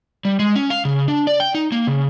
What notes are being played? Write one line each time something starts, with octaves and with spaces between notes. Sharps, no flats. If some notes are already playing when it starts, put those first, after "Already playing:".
G3
G#3
C#4
F5
C#3
D4
D5
G5
D#4
A#3
C#3